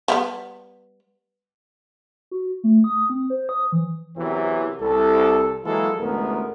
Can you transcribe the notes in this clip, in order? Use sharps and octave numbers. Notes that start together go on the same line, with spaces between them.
F3 G3 B3
F#4
A3
D#6
C4
C5
D#6
E3
E2 C3 E3 F#3 C4 A#4
C2 A4
E3 F#3 G#3 A#3 F4 A4
A1 D2 G#3 B3 A#4